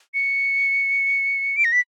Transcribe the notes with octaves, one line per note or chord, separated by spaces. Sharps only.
C#7
D7
A#6
B6